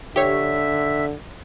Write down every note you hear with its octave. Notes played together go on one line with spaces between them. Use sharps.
D3 G4 C#5 E5